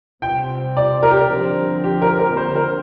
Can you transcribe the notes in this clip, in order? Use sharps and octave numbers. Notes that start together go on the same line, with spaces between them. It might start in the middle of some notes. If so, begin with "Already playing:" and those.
C3 G3 C4 G5
D5
A#4
G4
A#4
D3 F3 C4
G4
A#4
A#4
D3 F3 A#3 C5
A#4